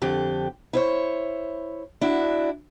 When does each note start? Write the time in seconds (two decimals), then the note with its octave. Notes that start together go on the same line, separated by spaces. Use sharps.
0.02 F2 D3 G4
0.73 E4 C5 C#5
2.01 D4 E4 F#4